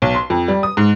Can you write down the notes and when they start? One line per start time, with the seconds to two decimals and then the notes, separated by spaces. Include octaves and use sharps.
0.02 B1
0.15 C6
0.30 F2
0.48 G3
0.63 D#6
0.77 G#2